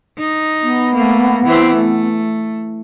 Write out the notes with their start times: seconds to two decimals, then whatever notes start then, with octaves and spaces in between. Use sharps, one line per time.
0.18 D#4
0.63 B3
0.95 A3 A#3
1.45 E3 C4
1.75 A3